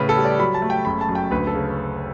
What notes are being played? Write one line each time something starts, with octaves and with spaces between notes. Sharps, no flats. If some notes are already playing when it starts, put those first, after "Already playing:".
Already playing: A2 C#3 B4
A4
G3
D5
F#3 B5
A5
A3
G5
F#1 B5
A5
F#2
G5
D2 B4
A4
C#3